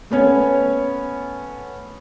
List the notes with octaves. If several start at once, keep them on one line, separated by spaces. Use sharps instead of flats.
A3 B3 C#4 C#5